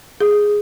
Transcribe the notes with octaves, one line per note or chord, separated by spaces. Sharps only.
G#4